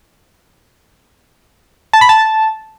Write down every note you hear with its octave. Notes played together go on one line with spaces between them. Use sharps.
A5
B5
A5